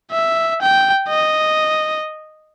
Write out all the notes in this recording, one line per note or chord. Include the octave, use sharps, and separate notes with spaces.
E5
G5
D#5